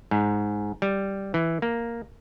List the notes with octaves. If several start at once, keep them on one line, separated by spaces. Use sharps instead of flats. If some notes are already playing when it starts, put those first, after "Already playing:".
G#2
G3
E3
A#3